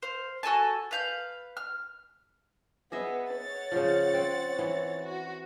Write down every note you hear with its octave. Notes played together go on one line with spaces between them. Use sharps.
C5 F5
F#4 A4 G#5 A5
B4 F5 G6
F6
B3 G#4 D#5 E5
C#5 F#5 A6
C#3 F3
C4
E3
F#4